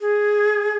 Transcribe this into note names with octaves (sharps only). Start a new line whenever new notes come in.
G#4